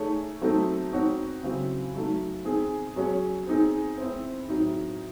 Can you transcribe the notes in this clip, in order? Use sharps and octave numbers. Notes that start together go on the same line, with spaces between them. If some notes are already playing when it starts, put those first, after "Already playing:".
Already playing: A3 D#4 G#4 C#5
F#3 A3 C4 D#4 A4
C4 D#4 F#4 C#5
C#3 F#3 C4 E4
F#3 A3 D#4
C4 D#4 G#4
F#3 C#4 G#4 C#5
C4 D#4 G#4
C4 E4 C5
A2 F#3 C4 D#4